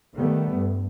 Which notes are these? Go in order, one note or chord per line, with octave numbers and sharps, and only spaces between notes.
D#3 G3 A3 B3
G2